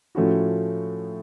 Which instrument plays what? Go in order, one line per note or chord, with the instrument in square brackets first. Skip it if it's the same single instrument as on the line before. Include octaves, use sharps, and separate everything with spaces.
[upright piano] A2 F3 A3 C#4 F#4